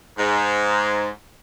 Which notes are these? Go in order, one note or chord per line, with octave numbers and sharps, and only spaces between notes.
G#2